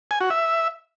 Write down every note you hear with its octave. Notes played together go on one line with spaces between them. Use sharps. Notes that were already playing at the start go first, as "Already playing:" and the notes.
G#5
F#4
E5